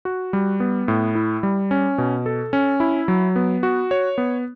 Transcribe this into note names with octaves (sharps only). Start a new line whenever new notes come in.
F#4
G3
B3
A2
E4
G3
C#4
B2
A4
C#4
E4
F#3
B3
F#4
C#5
B3